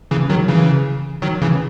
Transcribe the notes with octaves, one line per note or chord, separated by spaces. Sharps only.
C#3 E3
D#3 F#3
C#3 E3
D#3 F#3
C#3 E3